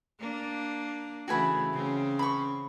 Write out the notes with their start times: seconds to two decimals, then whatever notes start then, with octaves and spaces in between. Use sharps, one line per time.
0.20 A#3 D4
1.28 C#3 E3 A3 F#4 G#5 B5
1.73 C#3 C4 C#4
2.19 B5 C#6